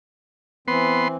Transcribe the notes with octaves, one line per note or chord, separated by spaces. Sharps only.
E3 B3 C4 C6